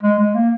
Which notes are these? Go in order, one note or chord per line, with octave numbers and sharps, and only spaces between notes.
G#3
G#3
A#3